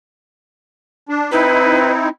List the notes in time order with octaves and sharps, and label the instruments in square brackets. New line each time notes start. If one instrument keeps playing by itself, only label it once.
[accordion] D4
[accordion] C4 D#4 E4 [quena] B4